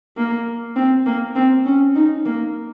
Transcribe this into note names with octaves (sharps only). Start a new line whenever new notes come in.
A#3
C4
A#3
C4
C#4
D#4
A#3